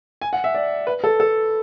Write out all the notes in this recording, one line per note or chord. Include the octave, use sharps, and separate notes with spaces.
G#5
F#5
E5
D5
B4
A4
A4